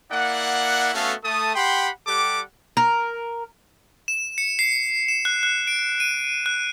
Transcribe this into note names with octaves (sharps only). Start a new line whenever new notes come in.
A#3 E4 D5 F#5
A3 B3 C#4 F#4 A4 F5
A3 A5 D#6
G4 F#5 G5 B5 C6
G3 G4 A4 F#5 D6
A#4
E7
C#7
C7
E7
F#6
F#6
D7
D#7
F#6